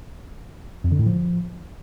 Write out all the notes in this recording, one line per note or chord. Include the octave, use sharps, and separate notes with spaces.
F2
D3
A2
F3